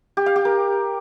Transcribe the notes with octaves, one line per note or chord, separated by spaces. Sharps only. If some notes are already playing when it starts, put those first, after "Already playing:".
G4
F5
G4
A#4